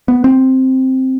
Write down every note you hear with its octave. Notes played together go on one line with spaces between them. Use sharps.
B3
C4